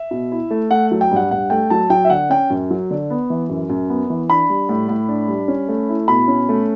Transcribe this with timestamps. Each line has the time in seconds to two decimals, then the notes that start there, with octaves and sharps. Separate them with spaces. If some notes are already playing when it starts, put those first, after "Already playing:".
Already playing: E5
0.11 B2
0.32 E4
0.50 A3
0.71 A3 F#5
0.91 F#3
1.01 G5
1.11 G2 F#5
1.31 G2 F#5
1.50 A3 G5
1.70 F#3 A5
1.90 F#3 G5
2.05 E5
2.10 D3 F#5
2.30 C#4 G5
2.50 F#2
2.71 F#3
2.91 D3
3.10 B3
3.30 E3
3.50 F#2
3.70 F#2
3.89 B3
4.10 E3
4.30 D4 B5
4.50 G3
4.69 A2
4.89 A2
5.09 D4
5.28 G3
5.48 C#4
5.68 A3
5.89 E4
6.08 B2 B5
6.28 C#4
6.49 A3